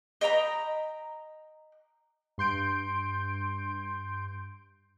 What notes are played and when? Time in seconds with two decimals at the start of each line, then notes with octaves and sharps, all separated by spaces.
0.21 D#5 G5 A#5 B5
2.38 G2 C6 G6 D7